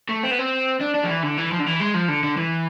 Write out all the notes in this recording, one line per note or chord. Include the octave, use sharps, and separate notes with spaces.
A3
C4
B3
C4
D4
D4
F3
E3
D3
E3
F3
D3
E3
G#3
F3
D3
D3
E3